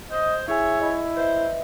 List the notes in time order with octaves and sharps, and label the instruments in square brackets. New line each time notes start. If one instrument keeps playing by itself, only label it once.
[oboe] C5 [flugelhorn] D#5
[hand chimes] E4 G#4 G#5 [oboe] C#5 [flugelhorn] E5
[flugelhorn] E4 [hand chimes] D#5
[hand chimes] B4 D#5 E5 [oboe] C5